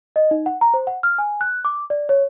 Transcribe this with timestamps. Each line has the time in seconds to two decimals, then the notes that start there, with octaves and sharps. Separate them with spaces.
0.16 D#5
0.31 D#4
0.46 F#5
0.61 A#5
0.74 C5
0.87 F#5
1.03 F6
1.18 G#5
1.41 F#6
1.65 D6
1.90 D5
2.09 C#5